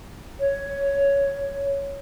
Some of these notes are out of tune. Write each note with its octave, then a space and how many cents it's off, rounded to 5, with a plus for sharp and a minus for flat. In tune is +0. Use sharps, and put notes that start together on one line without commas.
C#5 +5